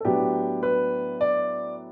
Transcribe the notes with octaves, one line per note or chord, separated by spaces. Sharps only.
A4
A2 F#3 B3 D4 G4
B4
D5